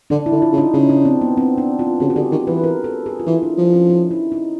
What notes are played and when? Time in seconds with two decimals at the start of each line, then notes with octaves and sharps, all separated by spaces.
0.10 D3 D4
0.26 E4
0.32 D3
0.42 F4
0.52 C#3
0.58 D#4
0.74 C#3 D#4
0.89 D4
1.05 C4
1.21 B3
1.37 C4
1.58 D4
1.79 F4
2.00 C#3 F#4
2.10 G#4
2.16 D3 G4
2.31 D#3 G#4
2.47 E3 B4
2.64 A#4
2.84 A4
3.06 G#4
3.20 F4
3.26 E3 E4
3.43 D4
3.58 F3
3.74 C#4
3.90 D#4
4.11 E4
4.32 D#4